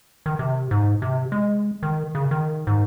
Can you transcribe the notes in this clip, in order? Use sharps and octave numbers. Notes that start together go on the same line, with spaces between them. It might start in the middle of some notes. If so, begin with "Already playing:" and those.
D#3
C3
G#2
C3
G#3
D#3
C#3
D#3
G#2